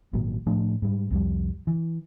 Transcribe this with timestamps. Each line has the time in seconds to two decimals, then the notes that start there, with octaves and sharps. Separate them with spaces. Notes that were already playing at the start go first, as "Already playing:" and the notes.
0.13 G#1 A#2 F#3
0.46 A2 F3 A3 D4
0.82 G#2 G3
1.10 C2 F2 G3
1.67 E3